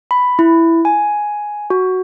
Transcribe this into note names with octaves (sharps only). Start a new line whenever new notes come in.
B5
E4
G#5
F#4